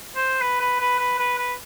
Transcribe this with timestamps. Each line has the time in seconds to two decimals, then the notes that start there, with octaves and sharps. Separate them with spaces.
0.16 C5
0.42 B4
0.60 B4
0.81 B4
0.99 B4
1.19 B4
1.38 B4